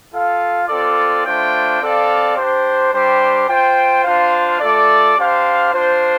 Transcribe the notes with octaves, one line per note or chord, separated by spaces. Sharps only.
F4 A4 F5
C4 F4 A4 D5
A3 D4 F4 C5 G5
C4 A4 D5 F5
D4 G4 C5
G3 D4 G4 C5
F4 C5 G5
D4 F4 C5 F5
A3 F4 A4 D5
D4 G4 C5 F5
D4 F4 C5